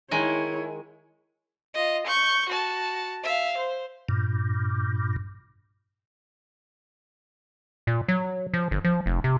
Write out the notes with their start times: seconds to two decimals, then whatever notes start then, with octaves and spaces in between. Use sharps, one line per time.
0.11 D#3 G#3 E4 C#5
1.74 F4 D#5
2.07 C#6 G6
2.49 F#4 A5
3.24 E5 F5
3.58 C5
4.09 G2 A#2
7.87 A#2
8.08 F#3
8.54 F3
8.71 G1
8.85 F3
9.06 F1
9.24 C3